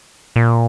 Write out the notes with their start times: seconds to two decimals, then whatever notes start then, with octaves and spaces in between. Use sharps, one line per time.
0.36 A#2